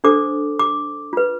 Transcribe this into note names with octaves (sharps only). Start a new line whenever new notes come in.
D4 A4 C5 D6
D6
F4 B4